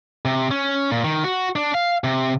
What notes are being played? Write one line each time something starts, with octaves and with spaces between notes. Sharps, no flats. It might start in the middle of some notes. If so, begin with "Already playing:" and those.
C3
C#4
A#2
D#3
F#4
D4
F5
C3